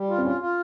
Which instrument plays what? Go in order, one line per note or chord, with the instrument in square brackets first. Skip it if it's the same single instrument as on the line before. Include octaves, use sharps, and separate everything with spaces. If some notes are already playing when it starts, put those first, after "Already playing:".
Already playing: [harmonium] G3
F4
[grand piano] C4
[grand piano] C#4 [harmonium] F4
[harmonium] F4